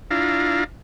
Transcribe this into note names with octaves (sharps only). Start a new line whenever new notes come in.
D4 E4 F4 F5 A#5